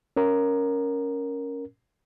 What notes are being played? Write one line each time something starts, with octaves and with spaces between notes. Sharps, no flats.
C#4 A#4